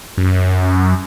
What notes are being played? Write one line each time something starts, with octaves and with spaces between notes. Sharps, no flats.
F#2